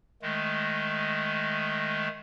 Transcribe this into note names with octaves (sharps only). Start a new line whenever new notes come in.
D#3 G#3 A3